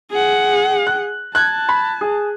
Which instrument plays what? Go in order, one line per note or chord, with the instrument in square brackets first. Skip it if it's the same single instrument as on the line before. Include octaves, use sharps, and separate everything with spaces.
[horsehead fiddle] G#4 F#5
[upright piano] F#6
[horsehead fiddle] A5 [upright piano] F#6 G#6
[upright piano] B5
G#4